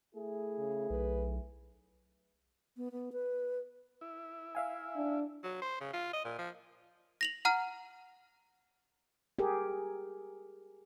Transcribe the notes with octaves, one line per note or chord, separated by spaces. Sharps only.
A3 E4 G#4
C#3
B1 B4
B3
B3
B4
E4
E5 F5 G#5
D4
F#3
C5
C#3
F4
D#5
A#2
F3
A#6 F7 F#7
F#5 A#5 F6
G4 G#4 A#4